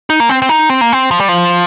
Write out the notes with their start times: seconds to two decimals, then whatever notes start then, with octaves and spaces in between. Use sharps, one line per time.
0.10 D#4
0.20 A#3
0.29 C4
0.42 C4
0.49 D#4
0.69 C4
0.81 A#3
0.93 C4
1.11 F3
1.20 G3
1.29 F3